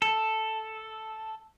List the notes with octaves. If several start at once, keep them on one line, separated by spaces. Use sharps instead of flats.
A4